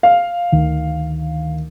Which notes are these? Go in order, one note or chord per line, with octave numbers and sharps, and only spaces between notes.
F5
D2 D#3